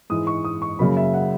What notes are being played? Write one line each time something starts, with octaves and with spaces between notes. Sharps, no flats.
G#2 E3 G#3 D#6
C#6
D#6
C#6
F#2 C#3 F#3 A#3 B5
E5
F#5